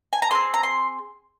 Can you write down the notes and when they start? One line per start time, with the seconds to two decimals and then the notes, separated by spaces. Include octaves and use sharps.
0.13 G#5
0.22 A#5
0.31 C4 F4 G#4 C6
0.54 A#5
0.63 C6